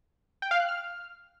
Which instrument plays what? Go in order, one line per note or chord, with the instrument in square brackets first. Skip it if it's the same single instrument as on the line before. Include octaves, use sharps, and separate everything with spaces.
[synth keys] G5
F5
F#6
F6